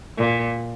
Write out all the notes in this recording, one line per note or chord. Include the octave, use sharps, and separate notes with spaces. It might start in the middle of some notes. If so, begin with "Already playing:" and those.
A#2